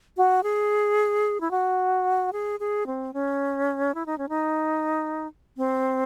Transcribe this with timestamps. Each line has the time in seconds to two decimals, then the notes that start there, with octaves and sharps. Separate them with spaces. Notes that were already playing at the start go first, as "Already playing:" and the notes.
0.17 F#4
0.43 G#4
1.41 E4
1.51 F#4
2.33 G#4
2.60 G#4
2.87 C4
3.14 C#4
3.95 E4
4.06 D#4
4.18 C#4
4.29 D#4
5.57 C4